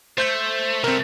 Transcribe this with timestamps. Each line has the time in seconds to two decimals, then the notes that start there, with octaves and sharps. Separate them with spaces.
0.18 A3 C5 G6 B6
0.84 C2 A3 C4 A#4